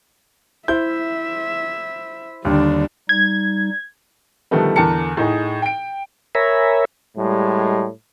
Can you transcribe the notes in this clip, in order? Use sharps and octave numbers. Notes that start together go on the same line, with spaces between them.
E4 C5 E5 G6
D#2 D3 G3 D4
G3 D#4 G#6
D3 D#3 F3 G3 A3 B3
E2 D3 A#4 A5 C#7
A2 D#4 G#4
G5 D7
A#4 C#5 E5 G#5 A#5 B5
A2 G3 G#3